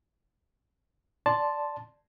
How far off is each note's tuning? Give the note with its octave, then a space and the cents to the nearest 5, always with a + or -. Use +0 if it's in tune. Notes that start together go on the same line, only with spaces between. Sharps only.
D5 +0 A5 +0 C6 +0